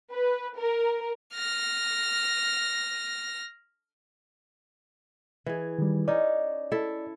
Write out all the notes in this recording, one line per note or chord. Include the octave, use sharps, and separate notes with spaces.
B4
A#4
F6 A#6
E3 G#4
D#3 G3
C#4 D#4 D5
E4 A4